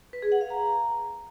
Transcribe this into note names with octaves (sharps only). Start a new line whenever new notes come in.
B4
G#4
F#5
F5
A#5